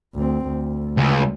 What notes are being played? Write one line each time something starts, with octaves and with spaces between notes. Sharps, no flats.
D2 C4
D2
C#2